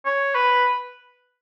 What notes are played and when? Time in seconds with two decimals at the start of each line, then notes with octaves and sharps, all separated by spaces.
0.05 C#5
0.35 B4